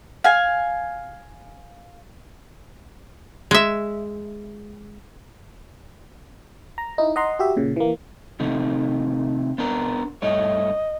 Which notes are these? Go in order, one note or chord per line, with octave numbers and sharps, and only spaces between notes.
F5 G#5
G#3 E5
A#5
D#4 E4
D#5 F#5 A#5 C6
F#4 G4 E5
A#2 C#3
E3 A#3
C3 D#3 A3
B3 D4 A#4
G2 A3 C#5 D#5